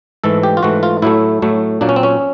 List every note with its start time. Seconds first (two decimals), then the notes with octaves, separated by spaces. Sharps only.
0.24 G#2 E3 A3 A4
0.43 G4
0.57 F4
0.63 G#2 E3 A3 F#4
0.83 F4
1.02 A2 F#3 A3 E4
1.42 A2 F#3 A3
1.81 A#2 F#3 A#3 D4
1.89 C#4
1.96 C4
2.03 C#4